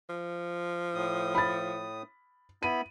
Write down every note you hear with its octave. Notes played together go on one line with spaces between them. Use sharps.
F3
A2 D#6
B5 A6
B3 E4 B5 D#7